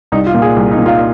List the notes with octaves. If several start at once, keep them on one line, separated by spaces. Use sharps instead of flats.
C2 D#4
F4
A#2
G#4
C2
D#4
A#2
F4